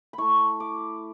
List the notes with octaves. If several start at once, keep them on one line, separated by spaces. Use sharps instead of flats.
B5
A3 E4 C#6
D6